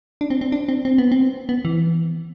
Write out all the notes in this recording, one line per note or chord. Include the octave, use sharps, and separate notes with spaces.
D4
C4
C4
D4
C4
C4
B3
C4
B3
E3